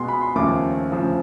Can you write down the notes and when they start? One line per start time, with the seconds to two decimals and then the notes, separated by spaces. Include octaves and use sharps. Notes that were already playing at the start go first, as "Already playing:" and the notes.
Already playing: B2 G#3 B3 C6
0.08 B5
0.21 C6
0.35 D#2 C#3 F3 A3 D6
0.91 D2 C#3 F3